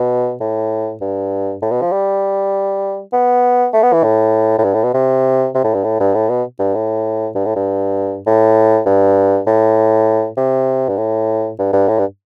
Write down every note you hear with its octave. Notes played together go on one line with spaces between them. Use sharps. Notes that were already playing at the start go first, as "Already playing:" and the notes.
Already playing: B2
A2
G2
A2
B2
F3
G3
B3
A3
B3
E3
A2
A2
G2
A2
B2
C3
C3
A2
G2
A2
G2
A2
B2
G2
A2
G2
A2
G2
A2
G2
A2
C3
G2
A2
G2
G2
A2
G2